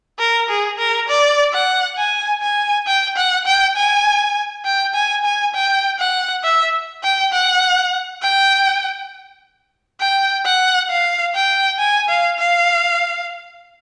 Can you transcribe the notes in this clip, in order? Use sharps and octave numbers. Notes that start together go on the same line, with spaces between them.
A#4
G#4
A#4
D5
F#5
G#5
G#5
G5
F#5
G5
G#5
G5
G#5
G#5
G5
F#5
E5
G5
F#5
G5
G5
F#5
F5
G5
G#5
F5
F5